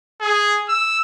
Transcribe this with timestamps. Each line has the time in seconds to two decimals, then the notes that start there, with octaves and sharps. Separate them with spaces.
0.21 G#4
0.69 E6